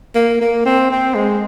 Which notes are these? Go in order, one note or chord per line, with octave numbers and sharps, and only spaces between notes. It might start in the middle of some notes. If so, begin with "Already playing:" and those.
A#3
A#3
C4
C4
G#3